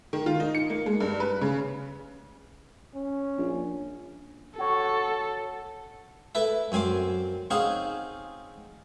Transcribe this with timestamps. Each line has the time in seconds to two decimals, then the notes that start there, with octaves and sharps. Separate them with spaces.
0.13 D#3
0.26 F4
0.40 D#4
0.55 C#7
0.70 A#3
0.86 G#3
1.00 G2
1.20 B4
1.41 C#3
2.94 C#4
3.37 A#1
4.58 F#4 A4 C#5
6.35 E4 A4 B4 E5
6.72 F#2 C4 G#5 C6 D6
7.50 C4 C#4 D#4 G#4 F5 F#5